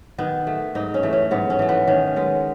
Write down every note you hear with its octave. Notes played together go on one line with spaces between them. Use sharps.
D#3 B3
A3
G#2 D#4
C#4
E3 A3
C#4
G#2 B3
C#4
E3 A3
B3
D#3 C#4
G#3 B3